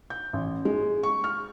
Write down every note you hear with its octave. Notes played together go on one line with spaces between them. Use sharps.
G6
A1
G#3
C#6
F6